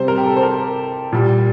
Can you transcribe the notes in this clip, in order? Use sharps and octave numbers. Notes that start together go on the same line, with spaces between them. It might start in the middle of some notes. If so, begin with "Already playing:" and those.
Already playing: C3 G3 C5
A#4
G4
A4
C5
A#4
A#2 G3